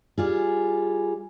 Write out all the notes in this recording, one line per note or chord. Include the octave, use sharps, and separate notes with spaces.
G3 F4 G#4